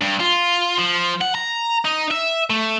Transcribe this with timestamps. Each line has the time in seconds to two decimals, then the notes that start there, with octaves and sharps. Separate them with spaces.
0.02 G2
0.20 F4
0.77 F3
1.21 F#5
1.35 A#5
1.85 D#4
2.11 E5
2.50 A3